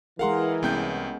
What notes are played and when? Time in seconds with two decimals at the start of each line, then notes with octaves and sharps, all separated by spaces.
0.19 E3 G#3 G#4 A#4 F5 F#5 C6
0.63 C2 G#3 B3 C#4 G5 G6